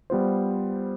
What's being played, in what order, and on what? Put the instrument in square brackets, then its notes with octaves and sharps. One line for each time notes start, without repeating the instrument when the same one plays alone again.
[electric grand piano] G3 B3 F4 C5